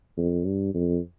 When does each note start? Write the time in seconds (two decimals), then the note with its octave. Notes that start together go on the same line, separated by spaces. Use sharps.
0.17 F2
0.45 G2
0.74 F2